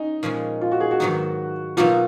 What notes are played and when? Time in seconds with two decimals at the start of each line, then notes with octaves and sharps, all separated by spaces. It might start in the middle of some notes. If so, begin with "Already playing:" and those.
Already playing: C#4 D#4
0.23 A#2 F3 G#3 C#4
0.61 F4
0.72 F#4
0.80 G#4
0.91 F#4
1.00 G#2 D#3 F#3 B3 D#4
1.77 B2 F#3 A#3 D#4 F4